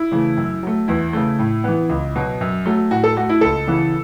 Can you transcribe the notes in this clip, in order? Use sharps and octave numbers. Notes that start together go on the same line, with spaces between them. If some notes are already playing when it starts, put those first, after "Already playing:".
Already playing: E4
C#3 E3 A3
F#2
F#3 A3
E2 E4
C#3 A3
A2
E3 B3
C#2
B2 F#3
F#2
F#3 A3
A2 F#4
A4
A3 F#4
E4
C#2 A4
C#3 E3 B3